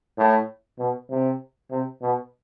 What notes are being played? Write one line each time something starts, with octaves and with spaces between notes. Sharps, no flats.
A2
B2
C3
C3
B2